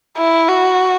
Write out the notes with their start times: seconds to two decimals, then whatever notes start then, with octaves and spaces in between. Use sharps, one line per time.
0.17 E4
0.49 F#4